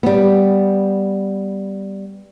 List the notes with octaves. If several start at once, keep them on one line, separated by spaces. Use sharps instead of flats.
G3 B3